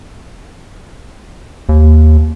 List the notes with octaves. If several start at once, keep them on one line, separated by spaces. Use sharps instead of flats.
D#2